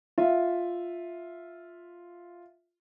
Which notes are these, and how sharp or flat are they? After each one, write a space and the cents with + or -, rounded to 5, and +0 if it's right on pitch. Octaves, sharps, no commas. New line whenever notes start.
F4 +0 E5 +0